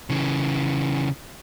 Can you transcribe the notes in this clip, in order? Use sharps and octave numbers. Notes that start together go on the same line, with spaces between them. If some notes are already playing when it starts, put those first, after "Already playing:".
C#3 E3